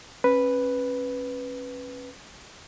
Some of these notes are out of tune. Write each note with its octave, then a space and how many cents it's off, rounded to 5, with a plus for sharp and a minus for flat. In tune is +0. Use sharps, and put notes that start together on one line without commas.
C#4 -30 B4 +0